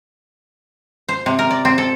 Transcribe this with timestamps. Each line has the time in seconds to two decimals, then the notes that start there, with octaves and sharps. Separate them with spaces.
1.08 C5
1.26 C3
1.39 A#4
1.50 D5
1.65 C4
1.78 A4